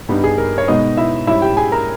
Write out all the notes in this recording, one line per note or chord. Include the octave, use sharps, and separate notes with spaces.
G2 G3 B3 D#4
G#4
A#4
C#5
B2 G#3 B3 D#4 D#5
E4 E5
G#2 G3 C#4 E4 E5
G4 G5
G#4 G#5
A#4 A#5